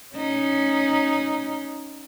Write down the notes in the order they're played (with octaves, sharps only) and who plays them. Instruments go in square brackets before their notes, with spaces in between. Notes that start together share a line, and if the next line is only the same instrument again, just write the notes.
[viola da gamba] C#4 D#4